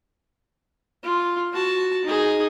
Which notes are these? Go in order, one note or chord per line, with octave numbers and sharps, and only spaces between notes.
F4
F#4 A5
D#4 G#4